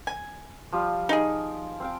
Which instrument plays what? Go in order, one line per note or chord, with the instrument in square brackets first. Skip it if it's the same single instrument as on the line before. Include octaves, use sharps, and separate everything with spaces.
[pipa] G#5
[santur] F3 G3 F4
[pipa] D#4 G#4 [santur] G5 G#5
[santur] C4 F5 G5